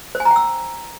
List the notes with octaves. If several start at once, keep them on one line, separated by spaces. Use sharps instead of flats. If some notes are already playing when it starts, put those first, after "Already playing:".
C5
G#5
A#5
G5
E6